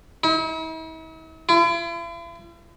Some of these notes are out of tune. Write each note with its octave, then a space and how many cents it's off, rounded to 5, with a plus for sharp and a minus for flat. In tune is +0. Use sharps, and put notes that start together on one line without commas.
E4 -45
E4 +45